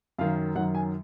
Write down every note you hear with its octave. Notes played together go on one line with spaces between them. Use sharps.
F#2 D#3 F#3 F5
F#2 D#3 F#3 F#5
G#5